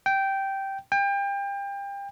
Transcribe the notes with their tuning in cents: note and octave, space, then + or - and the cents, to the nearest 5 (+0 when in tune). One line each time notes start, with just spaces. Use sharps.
G5 -10
G5 +30